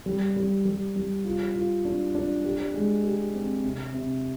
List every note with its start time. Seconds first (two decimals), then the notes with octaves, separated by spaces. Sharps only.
0.06 G3
0.37 G3
0.65 G3
0.96 G3
1.25 F4
1.56 F4
1.85 D4
2.15 D4
2.44 G4
2.74 G#3
3.04 G4
3.35 C4
3.63 C3
3.94 C3